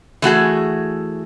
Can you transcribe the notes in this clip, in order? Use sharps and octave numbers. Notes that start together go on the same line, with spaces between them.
E3 A3 F#4 G#4